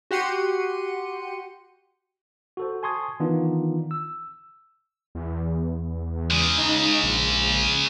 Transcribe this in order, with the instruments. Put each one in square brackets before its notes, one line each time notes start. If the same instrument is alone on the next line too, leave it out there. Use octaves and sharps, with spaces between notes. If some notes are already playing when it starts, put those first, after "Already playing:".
[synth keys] F#4 G4 F#5 C6 C#7 D#7
[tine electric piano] F#4 A4 C5
G#5 A5 C6 C#6 D#6 G#6
D#3 E3 B3 D4 D#4 F4
E6
[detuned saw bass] E2
[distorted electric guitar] C#3 G#3
[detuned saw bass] D#4
A#1